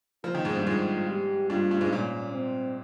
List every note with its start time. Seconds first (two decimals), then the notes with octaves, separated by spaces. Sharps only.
0.24 F3 F4
0.35 D#3
0.45 G#2
0.55 G2
0.66 G#2 F4
1.08 G4
1.49 G2 F4
1.71 G2
1.81 G#2
1.92 A#2 C#4
2.34 C4